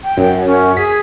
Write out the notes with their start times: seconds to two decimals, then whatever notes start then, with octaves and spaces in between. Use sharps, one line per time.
0.04 G5
0.17 F#2
0.46 C#4
0.77 G#4 B6